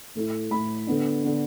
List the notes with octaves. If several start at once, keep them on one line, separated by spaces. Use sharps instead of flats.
A2 A3 E4
A2 A3 E4 B5
D3 B3 D4
D3 B3 D4